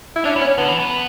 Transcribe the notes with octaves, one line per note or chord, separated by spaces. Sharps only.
E4
C#4 D4
B3
C#4
D3 B3
E3
B3